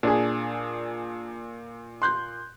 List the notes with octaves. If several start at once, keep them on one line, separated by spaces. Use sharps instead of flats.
A#2 D4 G#4
C6 F#6 G6